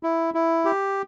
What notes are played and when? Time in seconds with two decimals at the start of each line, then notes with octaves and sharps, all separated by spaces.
0.03 E4
0.34 E4
0.65 G4